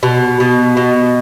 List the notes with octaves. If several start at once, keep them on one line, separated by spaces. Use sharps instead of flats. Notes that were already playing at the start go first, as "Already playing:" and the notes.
B2
B2
B2